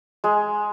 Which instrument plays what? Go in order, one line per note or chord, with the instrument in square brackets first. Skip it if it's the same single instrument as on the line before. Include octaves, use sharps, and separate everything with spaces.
[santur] G#3